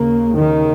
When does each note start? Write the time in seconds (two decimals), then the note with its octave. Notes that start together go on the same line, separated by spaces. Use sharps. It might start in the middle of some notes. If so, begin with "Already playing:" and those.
Already playing: D#2 C#3 A#3
0.35 D#3